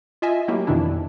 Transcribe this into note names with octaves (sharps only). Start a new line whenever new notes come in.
F4 D#5 E5 G#5
F#3 A3 A#3 E4 G4
F2 B2 D#3 E3 D4 E4